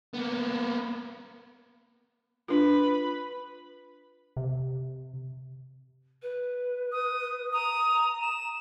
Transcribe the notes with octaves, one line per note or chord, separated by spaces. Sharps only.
A#3 B3
D4 F4 B4 B5
C3
B4
D#6
A#5 D#6
E7